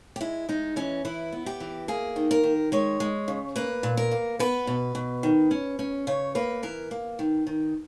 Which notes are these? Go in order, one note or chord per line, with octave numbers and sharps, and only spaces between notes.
G4
G#3 E4
G#3 D#4
E3 C#4
E3 E4
B3
G4
E3
A#3 G#4
D#3
A#4
D#3
G#3 C#5
G#3
C#3
A#3 B4
A#2
A#4
A#3
B3 B4
B2
B2
D#3
C#4
C#4
C#3 C#5
A#3 B4
E3 A#4
A#3
D#3
D#3